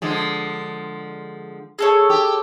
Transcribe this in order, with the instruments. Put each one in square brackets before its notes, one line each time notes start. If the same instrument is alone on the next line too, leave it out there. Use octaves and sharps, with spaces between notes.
[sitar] D3 F3 G#3
[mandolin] G#4 A4 C#5
[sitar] G4